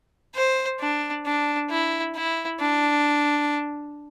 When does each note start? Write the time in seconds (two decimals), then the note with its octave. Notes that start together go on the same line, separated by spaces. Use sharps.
0.35 C5
0.80 D4
1.26 D4
1.70 E4
2.15 E4
2.60 D4